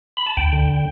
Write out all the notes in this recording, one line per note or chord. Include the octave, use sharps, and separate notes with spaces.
B5
A5
D2 G5
D3